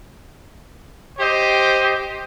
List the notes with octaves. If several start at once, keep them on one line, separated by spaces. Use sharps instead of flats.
G4 C5 D#5